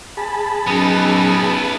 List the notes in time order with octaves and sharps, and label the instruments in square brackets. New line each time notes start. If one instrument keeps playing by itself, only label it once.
[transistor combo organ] G#4 A5 B5
[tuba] F#2 [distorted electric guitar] B3 D#4